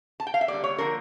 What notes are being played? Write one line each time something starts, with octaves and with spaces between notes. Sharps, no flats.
A5
G5
F5
E5
D3 G3 A#3 D5
C#5
D3 F3 A#3 A#4